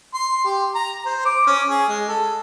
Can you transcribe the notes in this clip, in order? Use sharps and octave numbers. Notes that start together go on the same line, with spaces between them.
C6
G4
A#5
C5
D6
C#4
G#4
G#3
A4